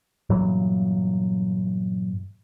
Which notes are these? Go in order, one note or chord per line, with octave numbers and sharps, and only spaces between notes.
G2 A#2 E3 F#3